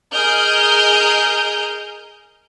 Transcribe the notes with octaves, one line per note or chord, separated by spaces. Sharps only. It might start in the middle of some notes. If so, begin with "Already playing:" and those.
G#4 A#4 D#5 F6 G6